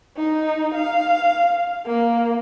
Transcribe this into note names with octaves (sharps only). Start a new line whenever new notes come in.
D#4
F5
A#3